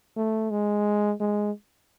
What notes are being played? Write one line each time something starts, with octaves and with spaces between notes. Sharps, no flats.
A3
G#3
G#3